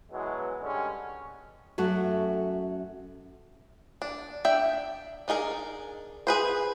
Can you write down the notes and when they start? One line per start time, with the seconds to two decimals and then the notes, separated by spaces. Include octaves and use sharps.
0.12 B2 E3 F#3 G#3
0.62 D3 G3 G#3 C#4
1.78 F#2 A3 F#4
4.02 D4
4.45 D4 E5 G5
5.28 D4 D#4 G#4 A#4
6.27 G#4 B4 C5